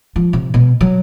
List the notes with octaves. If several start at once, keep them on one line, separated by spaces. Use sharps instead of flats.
F3
C3
B2
F#3